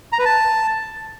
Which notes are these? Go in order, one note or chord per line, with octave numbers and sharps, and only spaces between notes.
A#5
B4
A5